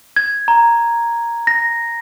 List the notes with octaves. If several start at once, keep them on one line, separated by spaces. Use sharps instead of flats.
G#6
A#5
A#6